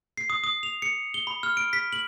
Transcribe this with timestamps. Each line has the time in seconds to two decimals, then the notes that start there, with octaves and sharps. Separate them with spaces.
0.17 C7
0.30 D#6
0.44 D#6
0.63 F7
0.82 C#7
1.14 G7
1.27 B5
1.43 F6
1.57 D7
1.73 B6
1.93 F#7